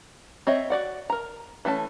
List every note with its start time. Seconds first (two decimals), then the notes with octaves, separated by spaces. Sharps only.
0.47 C4 C#5 D#5 E5
0.70 F#4 D5 F#5
1.10 A#4 A#5
1.65 E3 A3 C#4 A5